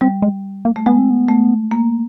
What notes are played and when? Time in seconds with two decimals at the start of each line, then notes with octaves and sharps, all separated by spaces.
0.01 G3 C4
0.22 G#3
0.65 A#3
0.76 A3
0.86 G#3 B3
0.98 C4
1.10 B3
1.28 A3
1.71 A#3